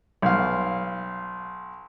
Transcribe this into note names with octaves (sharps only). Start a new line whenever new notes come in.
B1 F5